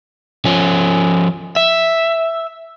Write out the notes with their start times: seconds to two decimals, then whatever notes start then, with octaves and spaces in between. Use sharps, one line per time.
0.45 F3 C#4
1.56 E5